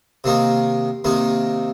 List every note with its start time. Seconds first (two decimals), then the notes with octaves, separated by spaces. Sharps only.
0.24 C3 D#3 A#3 D#4
1.04 C3 D#3 A#3 D#4